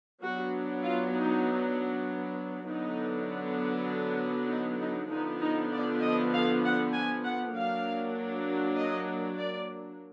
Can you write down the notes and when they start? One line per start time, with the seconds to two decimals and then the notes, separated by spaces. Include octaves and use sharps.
0.23 F#3 B3 D4 F#4
0.84 F4
1.14 D#4
2.67 D3 F#3 B3 D4 D#4
4.49 D#4
4.80 D#4
5.11 D3 F3 B3 D4 D#4
5.41 D#4
5.72 D5
6.02 D#5
6.33 F5
6.63 F#5
6.94 G#5
7.24 F#5
7.54 F#3 A#3 D4 F5
8.77 D#5
9.38 D5